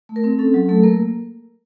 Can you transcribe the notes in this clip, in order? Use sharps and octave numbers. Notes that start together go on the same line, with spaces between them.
A3
A#4
C4
C#4 A4
F#3 A4
A3 A4
A#3 A#4